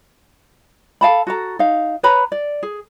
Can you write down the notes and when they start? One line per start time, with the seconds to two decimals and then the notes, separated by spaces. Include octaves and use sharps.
1.01 A4 F5 A5 B5
1.27 F#4 A4 A#5
1.59 D#4 F5
2.03 B4 C#5 A#5 B5
2.32 D5
2.63 G#4